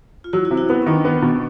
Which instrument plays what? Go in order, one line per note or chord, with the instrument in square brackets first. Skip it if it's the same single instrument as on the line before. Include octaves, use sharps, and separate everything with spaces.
[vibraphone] F4
[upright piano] F#3 [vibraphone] E4 F#4
[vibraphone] E4 F#4
[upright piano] C3
[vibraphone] E4 F#4
[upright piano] B3 [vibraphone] E4
[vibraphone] C#4
[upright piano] D#3 [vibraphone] D4
[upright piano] B3
B2